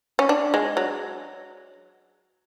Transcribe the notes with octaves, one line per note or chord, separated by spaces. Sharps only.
C#4
D4
G#3
F#3